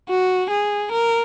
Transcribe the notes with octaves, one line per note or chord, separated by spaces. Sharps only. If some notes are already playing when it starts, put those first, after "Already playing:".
F#4
G#4
A#4